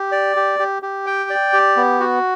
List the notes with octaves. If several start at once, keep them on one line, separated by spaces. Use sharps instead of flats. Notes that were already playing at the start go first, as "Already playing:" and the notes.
Already playing: G4
D5
G4
G4
G4
G5
D5
G4
B3
F#4